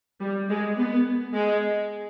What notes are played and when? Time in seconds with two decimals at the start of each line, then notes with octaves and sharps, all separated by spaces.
0.20 G3
0.50 G#3
0.77 B3
1.34 G#3